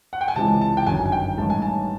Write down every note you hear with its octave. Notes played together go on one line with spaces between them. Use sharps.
F#5
G5
G#5
C#2 C3 E3 G#3 A5
A5
G5
G1 F#2 D#3 G#5
G#5
G5
A1 G2 D#3 G#3 A5
G#5
A5